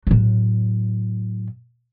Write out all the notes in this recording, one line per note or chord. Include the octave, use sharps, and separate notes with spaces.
A2 F#3